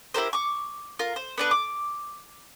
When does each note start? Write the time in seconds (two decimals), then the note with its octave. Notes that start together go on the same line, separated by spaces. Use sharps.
0.14 E4 G4 A#4 C5
0.33 C#6 D6
0.99 F4 A#4
1.16 C5
1.38 B3 D4 B4
1.51 D6